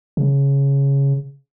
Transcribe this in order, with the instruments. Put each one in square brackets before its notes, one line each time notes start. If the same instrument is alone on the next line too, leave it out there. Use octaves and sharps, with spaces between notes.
[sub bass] C#3